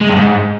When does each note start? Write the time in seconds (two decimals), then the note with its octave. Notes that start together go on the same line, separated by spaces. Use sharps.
0.01 G#3
0.09 G2
0.17 G#2